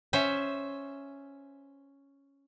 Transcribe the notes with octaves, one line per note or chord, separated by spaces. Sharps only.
C#4 C5 E5